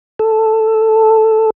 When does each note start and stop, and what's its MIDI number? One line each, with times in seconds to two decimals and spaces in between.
0.19 1.50 69